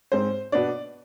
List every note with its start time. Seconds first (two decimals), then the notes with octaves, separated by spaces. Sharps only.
0.12 G#2 G#3 C4 C5
0.52 B2 B3 D4 D5